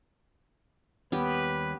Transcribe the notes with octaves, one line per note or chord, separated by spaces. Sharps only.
D#2 G3 B3 C#4 G4 B4